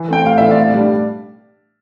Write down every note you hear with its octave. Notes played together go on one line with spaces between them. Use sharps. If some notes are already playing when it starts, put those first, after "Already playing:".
Already playing: E3
A3 C4 G5
A2 F5
E3 A3 C4 E5
D5 F5
A2
G3 D4